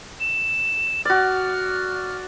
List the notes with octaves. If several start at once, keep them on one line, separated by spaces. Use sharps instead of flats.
E7
F#4 D5 F6